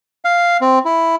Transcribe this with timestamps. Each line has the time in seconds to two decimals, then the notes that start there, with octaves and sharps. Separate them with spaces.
0.25 F5
0.61 C4
0.85 E4